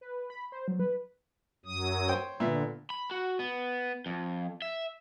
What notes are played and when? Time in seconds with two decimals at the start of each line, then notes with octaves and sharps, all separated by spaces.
0.01 B4
0.30 B5
0.52 C5
0.68 F#3
0.80 B4
1.65 F#2 F#3 D#6
2.08 C5 C#5 G5
2.40 A#2 D3 B3 E5
2.90 B5
3.11 F#4
3.39 B3
4.06 F2
4.62 E5